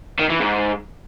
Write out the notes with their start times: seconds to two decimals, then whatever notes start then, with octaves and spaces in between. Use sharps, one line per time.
0.19 D#3
0.30 E3
0.41 G#2